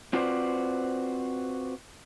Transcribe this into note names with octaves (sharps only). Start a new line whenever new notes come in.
C4 F4 F#4 B4 C5 D5